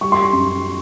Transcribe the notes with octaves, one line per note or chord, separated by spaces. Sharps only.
G3 C#6
C6
C#6
F#2